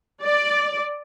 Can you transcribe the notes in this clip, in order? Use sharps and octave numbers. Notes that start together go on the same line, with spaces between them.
D5